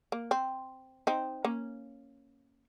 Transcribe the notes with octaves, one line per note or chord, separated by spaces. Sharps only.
A#3
C4
C4 D#4
A#3 C#4